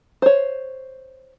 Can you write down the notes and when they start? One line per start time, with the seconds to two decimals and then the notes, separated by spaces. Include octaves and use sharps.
0.22 C5 C#5